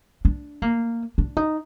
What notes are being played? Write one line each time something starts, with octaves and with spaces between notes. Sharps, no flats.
D4
A#3
D4
D#4